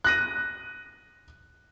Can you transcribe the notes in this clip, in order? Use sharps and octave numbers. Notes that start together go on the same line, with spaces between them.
F#6 A#6 D#7